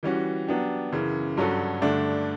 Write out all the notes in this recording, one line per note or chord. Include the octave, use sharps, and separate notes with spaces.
E3 G3 C#4 F#4
F#3 B3 D4 G4
F#2 C#3 E3
G2 F#3 C#4 F#4 A4
G2 D3 A3 D4